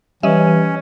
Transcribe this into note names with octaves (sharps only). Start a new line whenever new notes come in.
E3 G3 C#4 D#5 E5